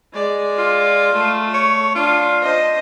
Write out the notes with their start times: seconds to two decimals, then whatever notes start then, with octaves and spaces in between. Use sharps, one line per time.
0.13 G#3 D5
0.58 F4
1.13 A3 A4
1.54 C#5
1.95 D4 F4
2.42 C5 D#5